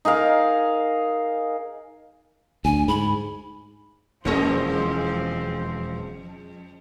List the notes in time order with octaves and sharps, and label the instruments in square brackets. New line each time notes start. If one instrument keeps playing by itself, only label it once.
[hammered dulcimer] D#4 G#4 A#4 F5
[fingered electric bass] D2 [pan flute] G#5
[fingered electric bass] G#2 [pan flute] B5
[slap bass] E1 [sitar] F2 G#3 D#5 [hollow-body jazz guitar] E3 A#3 [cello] F3 C4